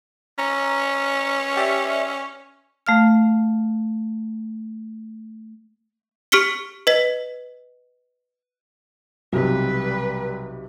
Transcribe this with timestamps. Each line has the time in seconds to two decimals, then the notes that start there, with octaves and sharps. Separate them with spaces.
0.38 C#4 A#5
1.57 G4 D5 E5
2.87 A3 F5 F6
6.32 G4 C#6 F6 B6 C#7 G7
6.87 B4 D#5 B6
9.33 B1 C3 G3 B4